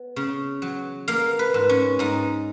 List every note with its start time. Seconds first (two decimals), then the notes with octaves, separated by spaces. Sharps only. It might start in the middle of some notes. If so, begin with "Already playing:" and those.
Already playing: B3
0.16 C#3
0.62 F#3
1.08 A#3 F5
1.39 B4
1.54 G#2
1.69 C#4
1.99 G#2 D#4